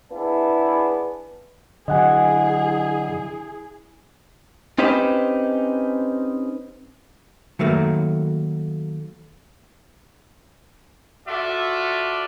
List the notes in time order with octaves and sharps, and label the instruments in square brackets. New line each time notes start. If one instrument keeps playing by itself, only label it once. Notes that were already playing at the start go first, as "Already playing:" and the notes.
[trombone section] B3 D4 E4 G#4
[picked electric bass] D3 F#3 [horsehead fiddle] E4 G#4 [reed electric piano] D#5 F#5 G#5
[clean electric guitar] C4 C#4 D#4 G4 B4 C5
[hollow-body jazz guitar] D#3 F#3 A3 A#3
[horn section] F4 F#4 A4 D5 E5